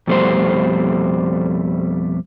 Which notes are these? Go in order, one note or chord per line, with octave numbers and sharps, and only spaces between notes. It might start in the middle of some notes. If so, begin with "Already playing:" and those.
F2 B2 G3 A3 C5